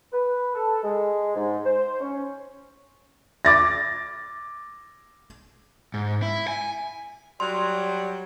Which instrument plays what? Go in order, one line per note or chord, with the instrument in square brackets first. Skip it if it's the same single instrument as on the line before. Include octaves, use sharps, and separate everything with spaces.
[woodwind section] B4
A4
G#3
G#2
C5
C#4
[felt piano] D6 A6 A#6
[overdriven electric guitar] G#2
E4
G#5
[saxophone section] F#3 G3 [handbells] C6